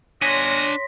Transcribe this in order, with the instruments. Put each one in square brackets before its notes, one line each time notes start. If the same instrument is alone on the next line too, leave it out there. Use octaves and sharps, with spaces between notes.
[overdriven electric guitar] D4 G#5 [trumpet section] F#4 D#5 [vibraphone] C#5 C6 [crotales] A#6 B6